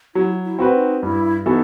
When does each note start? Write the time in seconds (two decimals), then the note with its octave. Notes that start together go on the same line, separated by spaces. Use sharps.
0.15 F#3 E4
0.44 E4
0.59 C4 F#4 B4
0.74 D#4
1.03 G2 E4
1.46 E3 B3 D#4 F#4 A4